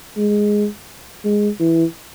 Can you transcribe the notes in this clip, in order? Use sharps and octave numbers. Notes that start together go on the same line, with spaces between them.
G#3
G#3
E3